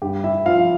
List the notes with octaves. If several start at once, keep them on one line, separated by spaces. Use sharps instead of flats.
G2 G4
E4 E5
F3 F4 F5